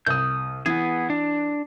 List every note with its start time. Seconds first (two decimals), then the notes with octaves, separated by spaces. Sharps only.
0.06 C2 D#6 G6
0.66 E3 B3 G#4
1.10 D4